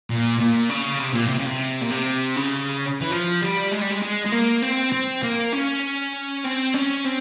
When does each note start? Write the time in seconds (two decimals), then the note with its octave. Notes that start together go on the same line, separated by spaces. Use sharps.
0.10 A#2
0.40 A#2
0.69 C#3
1.00 C3
1.14 A#2
1.28 C3
1.38 C#3
1.46 C3
1.82 A#2
1.91 C3
2.36 C#3
3.01 E3
3.11 F3
3.42 G3
3.72 G#3
3.82 G3
3.91 G#3
4.02 G#3
4.26 G#3
4.32 A#3
4.63 C4
4.92 C4
5.23 A#3
5.53 C#4
6.44 C4
6.74 C#4
7.04 C4